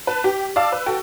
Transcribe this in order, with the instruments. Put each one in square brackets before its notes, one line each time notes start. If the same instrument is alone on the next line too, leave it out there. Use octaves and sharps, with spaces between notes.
[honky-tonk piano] B4 A5
G4
D5 F5 A5 D6 E6
B4
F#4 A4 G5